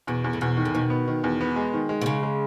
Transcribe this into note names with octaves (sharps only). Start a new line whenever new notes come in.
E2 B2
E2
A2
E2 B2
D#3
A2
B2 D#3
B3
D#3
E2
B3
G#3
D#3
G#3
B2
C#3 G#3
G#3